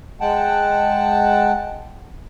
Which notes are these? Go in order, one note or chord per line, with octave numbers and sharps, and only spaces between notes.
G#3 F#5 G5 A5